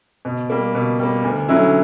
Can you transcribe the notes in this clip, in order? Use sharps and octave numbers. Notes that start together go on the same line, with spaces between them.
B2
G3 A#3
B2
G3 A#3
D2
D3 F#3 C#4 E4